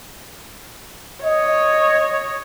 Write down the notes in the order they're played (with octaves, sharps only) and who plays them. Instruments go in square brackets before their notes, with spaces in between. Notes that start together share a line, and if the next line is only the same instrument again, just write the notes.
[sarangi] C#5 [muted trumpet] D#5